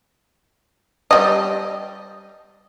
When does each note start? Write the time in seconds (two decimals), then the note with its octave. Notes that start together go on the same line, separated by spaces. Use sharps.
1.11 G3 D#5